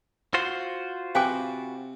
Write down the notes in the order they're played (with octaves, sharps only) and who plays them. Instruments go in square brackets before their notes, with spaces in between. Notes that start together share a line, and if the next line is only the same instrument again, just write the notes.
[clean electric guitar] F4 F#4 C5
[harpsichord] C3 [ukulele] B4 G5 [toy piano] F5 G#5 D6